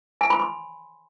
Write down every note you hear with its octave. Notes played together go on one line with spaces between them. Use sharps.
G#5
B5
C6